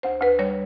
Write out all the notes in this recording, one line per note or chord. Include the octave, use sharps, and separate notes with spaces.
D2 C5
D2 B4
G3 C#5